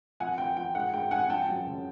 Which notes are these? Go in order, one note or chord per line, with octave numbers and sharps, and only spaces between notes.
F2 F#5 G#5
F3 G5
F3 G5
G#2 F#5
G#2 G5
G#2 F#5 G#5
F3 G5 A5
F#2
C#3